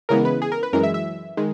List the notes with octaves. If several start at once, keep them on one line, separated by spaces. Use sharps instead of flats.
C#3 E3 G#3 B3 A#4
B4
G#4
A#4
B4
F#2 E3 G#3 A#4
E5
E5
D#3 G#3